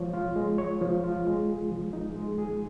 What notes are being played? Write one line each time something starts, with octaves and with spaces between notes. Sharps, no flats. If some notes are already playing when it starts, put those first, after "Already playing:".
Already playing: F3 G#3 C#5
F4
G#3
C#5
F3
F4
G#3
G#4
F3
D#4
G#3
G#4